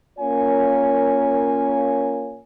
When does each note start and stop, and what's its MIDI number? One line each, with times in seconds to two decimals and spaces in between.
0.19 2.40 58
0.19 2.40 61
0.19 2.40 65
0.19 2.40 70
0.19 2.40 73
0.19 2.40 80